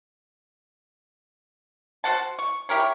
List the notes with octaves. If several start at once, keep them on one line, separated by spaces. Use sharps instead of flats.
F#4 C5 F#5 A5
C#6
E4 G4 A#4 C#5